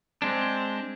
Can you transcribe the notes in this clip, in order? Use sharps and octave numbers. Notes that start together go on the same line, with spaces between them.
G#3 C4 D4